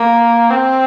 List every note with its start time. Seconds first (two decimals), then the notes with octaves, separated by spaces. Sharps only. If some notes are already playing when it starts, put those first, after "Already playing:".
Already playing: A#3
0.50 C4